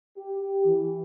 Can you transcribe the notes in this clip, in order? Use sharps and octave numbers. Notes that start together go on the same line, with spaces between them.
G4
E3